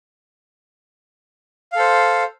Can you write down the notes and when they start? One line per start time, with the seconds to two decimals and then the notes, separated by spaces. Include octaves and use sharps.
1.73 F5
1.76 A4
1.79 C5